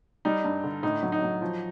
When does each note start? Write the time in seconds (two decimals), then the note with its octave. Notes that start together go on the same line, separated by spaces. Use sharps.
0.25 G3 D#4
0.44 G2
0.64 D3
0.83 A2 D#4
1.03 F#3
1.12 D#4
1.22 F#3
1.42 F3